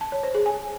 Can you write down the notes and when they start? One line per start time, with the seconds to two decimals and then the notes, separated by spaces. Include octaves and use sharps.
0.01 A5
0.12 C#5
0.23 C5
0.35 G#4
0.46 G#5